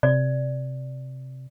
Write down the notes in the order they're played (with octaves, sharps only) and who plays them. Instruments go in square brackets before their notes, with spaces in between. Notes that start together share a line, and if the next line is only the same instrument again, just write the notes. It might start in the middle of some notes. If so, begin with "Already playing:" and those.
[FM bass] C3 [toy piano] D5